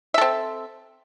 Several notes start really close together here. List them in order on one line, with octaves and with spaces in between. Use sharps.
E5 A4 C4